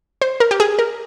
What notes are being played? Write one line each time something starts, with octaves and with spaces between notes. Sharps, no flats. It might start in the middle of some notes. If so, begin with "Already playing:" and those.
C5
A#4
G4
G#4
A#4